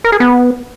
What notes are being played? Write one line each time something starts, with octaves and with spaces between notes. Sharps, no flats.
A#4
G#4
B3